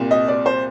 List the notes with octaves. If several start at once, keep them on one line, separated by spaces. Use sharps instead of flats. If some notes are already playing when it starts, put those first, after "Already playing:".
Already playing: C2 A#2
D#5
D5
C5